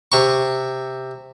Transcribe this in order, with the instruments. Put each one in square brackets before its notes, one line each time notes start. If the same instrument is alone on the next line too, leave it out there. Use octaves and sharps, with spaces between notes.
[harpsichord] C3 C#6